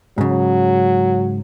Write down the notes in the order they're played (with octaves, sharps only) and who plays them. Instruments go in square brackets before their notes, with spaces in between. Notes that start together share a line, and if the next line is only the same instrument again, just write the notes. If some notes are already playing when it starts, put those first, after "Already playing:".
[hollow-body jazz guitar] G#2 C#3 [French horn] F#3